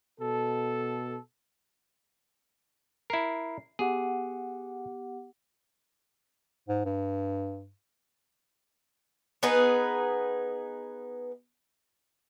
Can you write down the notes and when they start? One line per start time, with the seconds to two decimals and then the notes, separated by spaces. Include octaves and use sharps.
0.20 B2 A4
3.10 E4 A#4 C7
3.79 B3 G4 G#4 F#5
6.68 G#2
6.85 G2
9.43 B3 D#4 G#4 B4